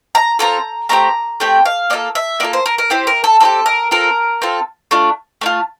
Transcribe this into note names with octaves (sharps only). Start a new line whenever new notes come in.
A#5
C4 F4 A4 A#5
A3 C4 G4 A#5
A3 C4 G4 G5
F5
A#3 F4 A4 D5
E5
A#3 F4 A4 D5
C5
A#4
A#4
C4 E4 G4 C5
A#4
A4
C4 E4 G4 A4
A#4
C4 F4 A4 A#4
C4 F4 A4
A3 D4 F4
A3 D4 F4